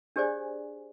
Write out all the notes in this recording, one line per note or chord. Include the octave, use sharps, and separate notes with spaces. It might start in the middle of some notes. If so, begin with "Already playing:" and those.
D4 G4 G#4 C5 D5 G#5